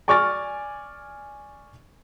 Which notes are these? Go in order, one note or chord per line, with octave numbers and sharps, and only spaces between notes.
D5 G#5 C#6 D6 F6 A6